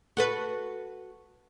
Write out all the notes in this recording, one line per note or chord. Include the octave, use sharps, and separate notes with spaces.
F#4 A4 B4